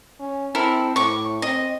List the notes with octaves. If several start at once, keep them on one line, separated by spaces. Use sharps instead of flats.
C#4
C4 E4 A4 A#4
A2 C#6 D6
C4 D#5